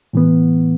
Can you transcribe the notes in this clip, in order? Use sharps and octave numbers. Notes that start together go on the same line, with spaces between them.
A2 E3 B3